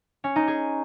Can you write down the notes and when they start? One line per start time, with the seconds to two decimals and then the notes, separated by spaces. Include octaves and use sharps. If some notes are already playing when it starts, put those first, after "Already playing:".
0.24 C#4
0.36 D#4
0.48 G#4